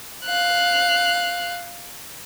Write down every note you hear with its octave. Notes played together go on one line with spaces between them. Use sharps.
F5 F#6